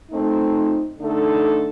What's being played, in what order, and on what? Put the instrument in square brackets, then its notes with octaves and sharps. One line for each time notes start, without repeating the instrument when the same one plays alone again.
[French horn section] F3 A3 C4 D#4
D3 A3 D#4 A4